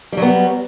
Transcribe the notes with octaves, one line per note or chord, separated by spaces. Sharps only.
F#3 G3 B3